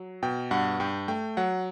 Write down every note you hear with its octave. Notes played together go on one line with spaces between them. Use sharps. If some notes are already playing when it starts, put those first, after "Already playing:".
Already playing: F#3
B2 G5
G2 F#5
G2 G5
A3 G5
F#3 F#5